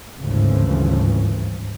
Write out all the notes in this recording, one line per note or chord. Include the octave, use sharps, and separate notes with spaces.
G#1 D2 G2 C#3 E3 F3